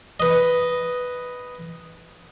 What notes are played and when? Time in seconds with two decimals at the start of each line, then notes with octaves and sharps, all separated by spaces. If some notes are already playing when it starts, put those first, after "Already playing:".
0.20 B4 D#5